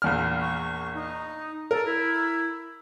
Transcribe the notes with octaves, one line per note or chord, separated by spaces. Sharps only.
A#1 E2 F6
C#6
D#4
A4 A#4
E4